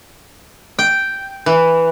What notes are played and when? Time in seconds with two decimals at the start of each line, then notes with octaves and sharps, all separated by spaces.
0.79 G5
1.46 E3